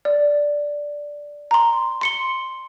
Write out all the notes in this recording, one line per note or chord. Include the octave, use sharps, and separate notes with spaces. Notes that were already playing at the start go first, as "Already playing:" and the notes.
D5
A#5 C6
C6 C#7 G7